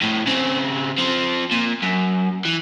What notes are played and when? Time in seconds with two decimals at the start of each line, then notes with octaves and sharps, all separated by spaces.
0.01 F2 A2
0.26 C#3 C4
0.98 F3 C4
1.51 A#2
1.83 F#2
2.45 E3